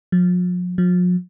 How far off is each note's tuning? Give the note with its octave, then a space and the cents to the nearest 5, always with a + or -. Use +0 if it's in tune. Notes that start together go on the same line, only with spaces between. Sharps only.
F3 +45
F3 +45